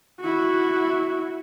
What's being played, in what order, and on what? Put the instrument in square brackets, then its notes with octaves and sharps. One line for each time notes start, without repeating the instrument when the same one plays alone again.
[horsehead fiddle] E4 F#4